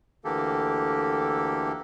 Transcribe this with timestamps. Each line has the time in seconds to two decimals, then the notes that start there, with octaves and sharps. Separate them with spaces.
0.25 D2 D3 E3 A#3 G4 A4